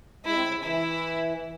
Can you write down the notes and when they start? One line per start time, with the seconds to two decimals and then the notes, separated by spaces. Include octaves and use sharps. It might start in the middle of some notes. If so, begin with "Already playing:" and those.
0.25 G#3 E4
0.34 C4
0.44 C#3
0.63 E3 E4